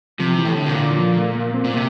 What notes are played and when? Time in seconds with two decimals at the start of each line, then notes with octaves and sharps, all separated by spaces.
0.19 C3 F3
0.38 E3
0.45 A2
0.57 D3
0.66 C3
0.71 A#2
0.77 D3
0.91 E3
0.96 F3
1.16 A3
1.35 A#3
1.54 C4
1.64 A#2
1.74 C3 A#3